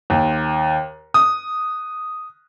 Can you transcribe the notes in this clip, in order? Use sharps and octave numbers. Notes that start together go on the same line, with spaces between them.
D#2
D#6